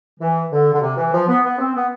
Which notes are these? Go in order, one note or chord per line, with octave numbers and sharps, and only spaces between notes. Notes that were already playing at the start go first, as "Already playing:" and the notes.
E3
D3
D3
C3
E3
F3
B3
B3
C4
B3